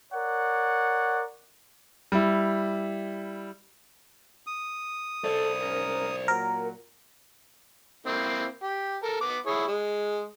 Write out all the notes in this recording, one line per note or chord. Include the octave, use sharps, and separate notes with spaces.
A#4 C#5 D5 F#5
G3 E4
D#6
A4 C5 D5
G#2 C#4 A#4
A#2 F#3 A#4
A#3 C4 E4
G4
A4 A#4
B3 B4 D6
E4 G#4 C#5
G#3